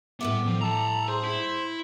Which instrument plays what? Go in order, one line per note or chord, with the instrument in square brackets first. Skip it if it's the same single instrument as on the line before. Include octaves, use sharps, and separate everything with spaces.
[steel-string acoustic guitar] A2 G3 E5 [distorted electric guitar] B3 [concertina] D6
[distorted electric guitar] F3
[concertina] A4 [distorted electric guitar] A5 A#5
[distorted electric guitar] G#4 [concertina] C5
[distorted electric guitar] E4